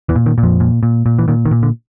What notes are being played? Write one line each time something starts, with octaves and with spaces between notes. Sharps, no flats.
E2 E3
A#2
D#3
A#2
F2 F3
A#2
A#2
A#2
E3
A#2 D#3
D#3
A#2
D3